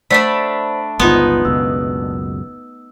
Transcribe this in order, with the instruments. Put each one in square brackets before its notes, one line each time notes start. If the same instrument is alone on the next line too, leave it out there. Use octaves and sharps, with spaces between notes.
[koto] A3 [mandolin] D4 E5 B5 [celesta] C5 D5 F#5
[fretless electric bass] G1 C#2 [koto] B3 D#4 [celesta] F4 C6
[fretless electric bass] F#1 C#2 B2 [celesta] E6